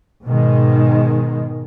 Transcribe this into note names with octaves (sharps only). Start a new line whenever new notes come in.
G#2 B2 D#3 G#3